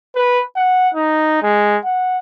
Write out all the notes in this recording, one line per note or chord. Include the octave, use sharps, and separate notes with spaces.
B4
F#5
D#4
G#3
F#5